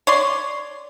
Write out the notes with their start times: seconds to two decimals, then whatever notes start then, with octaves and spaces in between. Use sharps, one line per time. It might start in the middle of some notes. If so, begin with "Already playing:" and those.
0.07 C#5 D5 C6